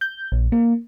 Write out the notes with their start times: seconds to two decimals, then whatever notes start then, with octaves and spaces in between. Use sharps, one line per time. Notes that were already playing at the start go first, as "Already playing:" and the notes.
0.01 G6
0.32 A#1
0.52 A#3